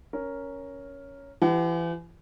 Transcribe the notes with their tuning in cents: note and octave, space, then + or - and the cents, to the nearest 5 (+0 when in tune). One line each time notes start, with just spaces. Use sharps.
C#4 +5 A#4 +0
E3 +35 G4 +0 F#5 +35